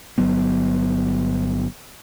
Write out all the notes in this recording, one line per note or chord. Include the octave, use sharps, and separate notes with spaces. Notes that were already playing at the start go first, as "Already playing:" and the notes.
G1 F#3 B3